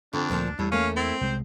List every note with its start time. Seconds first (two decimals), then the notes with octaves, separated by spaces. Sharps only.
0.13 F2 D3 D4
0.30 D2 A#2 F3
0.59 E2 A2 G3
0.72 A3 A#3 C#4 F5
0.96 C4 E4
1.21 C2 G#3 C5